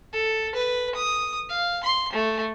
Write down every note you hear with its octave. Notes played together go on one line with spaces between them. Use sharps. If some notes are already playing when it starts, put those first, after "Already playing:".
A4
B4
D#6
F5
C6
A3